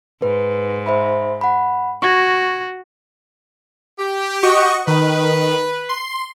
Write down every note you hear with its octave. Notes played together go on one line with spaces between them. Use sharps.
G#2 B4
C5 E5 B5
F#5 B5
F#4 C#6 G#6 A#6
G4
F#4 D#5 C#6
D#3 B4
C6